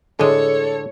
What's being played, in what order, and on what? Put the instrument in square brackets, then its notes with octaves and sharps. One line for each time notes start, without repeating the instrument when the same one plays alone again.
[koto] A2 G#3 [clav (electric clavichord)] D3 [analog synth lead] A4 [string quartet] C#5